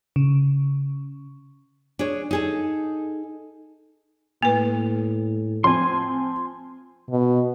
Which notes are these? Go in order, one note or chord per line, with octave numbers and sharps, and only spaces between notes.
C#3
D4 G#4 C#5
D#4 G#4 A4
A2 A#3 B4
F3 C4 G#5 C6
B2